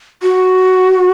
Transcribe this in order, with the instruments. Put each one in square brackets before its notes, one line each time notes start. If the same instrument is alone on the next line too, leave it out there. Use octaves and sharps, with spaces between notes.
[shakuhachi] F#4